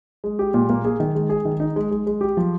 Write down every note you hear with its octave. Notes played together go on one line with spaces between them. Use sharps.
G#3
G4
A#2
A#3
G#4
D#3
G#3
G#4
D#3
D#4
G#3
G#3
G#3
G4
F3